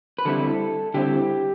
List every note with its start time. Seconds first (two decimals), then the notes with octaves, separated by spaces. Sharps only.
0.19 B4
0.25 D3 G3 C4 E4 A4
0.94 D3 G3 C4 E4 G4